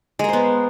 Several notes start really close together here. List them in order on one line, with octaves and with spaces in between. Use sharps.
G#3 A#4 C5 B3